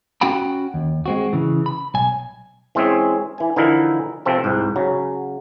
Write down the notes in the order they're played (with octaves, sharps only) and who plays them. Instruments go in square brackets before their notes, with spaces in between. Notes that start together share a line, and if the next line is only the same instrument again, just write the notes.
[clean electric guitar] C#4 F#4 F#5 G5 B5
D#2
G#3 C4 F#4
C#3 E3
B5
B1 G#5
[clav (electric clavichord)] E3 G#3 C4 C#4 G#4
E3 G#5
D3 E3 F3 D#4 E4 A#4
C3 F3 C4 A4
C2 G#2
C#3 F#3